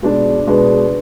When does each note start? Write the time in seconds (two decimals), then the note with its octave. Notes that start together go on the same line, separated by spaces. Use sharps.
0.02 B2 G#3 B3 D4
0.47 B2 G#3 B3 D4